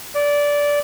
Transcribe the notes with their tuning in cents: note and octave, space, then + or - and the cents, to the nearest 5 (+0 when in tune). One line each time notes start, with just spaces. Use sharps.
D5 -15